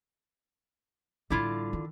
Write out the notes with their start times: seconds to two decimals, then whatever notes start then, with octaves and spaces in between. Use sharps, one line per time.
1.30 A1 D3 G3 E4 F4
1.73 D#3